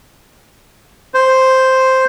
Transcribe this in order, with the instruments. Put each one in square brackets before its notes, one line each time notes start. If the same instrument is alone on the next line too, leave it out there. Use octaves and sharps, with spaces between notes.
[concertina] C5